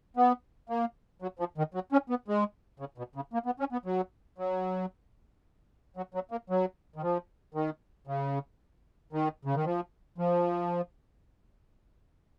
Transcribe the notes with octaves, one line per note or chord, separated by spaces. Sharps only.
B3
A#3
F#3
F3
D#3
F#3
C#4
B3
G#3
C#3
B2
C#3
A#3
B3
C#4
B3
F#3
F#3
F#3
F#3
A#3
F#3
D#3
F3
D#3
C#3
D#3
C#3
D#3
F3
F3